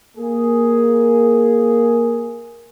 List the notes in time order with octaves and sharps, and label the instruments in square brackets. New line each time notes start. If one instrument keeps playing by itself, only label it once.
[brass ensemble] A#3 G#4